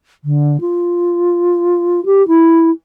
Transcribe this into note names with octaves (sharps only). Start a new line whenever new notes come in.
D3
F4
G4
E4